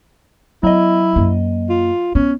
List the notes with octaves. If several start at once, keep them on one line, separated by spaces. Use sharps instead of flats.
F#3 B3 E4 D#5
F#2 A#3
F4
B3 C#4